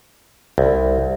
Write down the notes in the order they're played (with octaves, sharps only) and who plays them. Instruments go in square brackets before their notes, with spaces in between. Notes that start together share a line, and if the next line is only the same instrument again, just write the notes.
[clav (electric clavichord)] C2